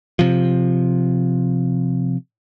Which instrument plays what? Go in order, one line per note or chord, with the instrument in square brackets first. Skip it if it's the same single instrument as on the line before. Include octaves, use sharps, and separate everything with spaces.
[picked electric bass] C3 F3